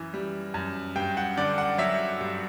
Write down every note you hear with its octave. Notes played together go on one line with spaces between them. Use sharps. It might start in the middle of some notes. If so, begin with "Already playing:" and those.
Already playing: F#2 E3
G3
F#2
G2 G5
F#5
D3 D5
F#5
F#3 E5
G2